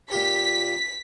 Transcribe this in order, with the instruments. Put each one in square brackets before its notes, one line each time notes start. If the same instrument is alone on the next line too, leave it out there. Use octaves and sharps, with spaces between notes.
[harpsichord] A#2 F4 G4 [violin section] B6